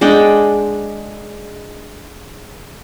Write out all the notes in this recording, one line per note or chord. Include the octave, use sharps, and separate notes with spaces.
G#3 D4 F#5 G5